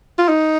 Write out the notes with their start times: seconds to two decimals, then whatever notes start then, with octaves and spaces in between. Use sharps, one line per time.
0.18 F4
0.29 D#4